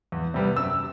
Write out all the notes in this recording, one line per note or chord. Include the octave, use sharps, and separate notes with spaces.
E2
C3 G3 B3
F#2 E6